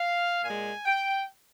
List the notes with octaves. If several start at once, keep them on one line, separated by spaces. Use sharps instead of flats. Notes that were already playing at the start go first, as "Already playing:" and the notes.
Already playing: F5
A#2 G#3 G#5
G5